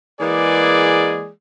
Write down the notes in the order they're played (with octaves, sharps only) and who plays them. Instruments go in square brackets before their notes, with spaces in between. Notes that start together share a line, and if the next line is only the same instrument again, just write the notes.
[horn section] E3 G#3 A#3 G#4 D5